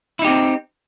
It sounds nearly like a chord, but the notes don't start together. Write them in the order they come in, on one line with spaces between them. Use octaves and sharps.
E4 D#4 G4 C4